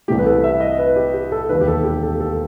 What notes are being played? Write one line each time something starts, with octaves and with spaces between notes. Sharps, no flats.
C2 C3 E3 A3 G4
B4
A4
E5
D#5
B4
G4
G4
A4
E1 D#2 D#3 B4
G4
A4
G4
A4
A4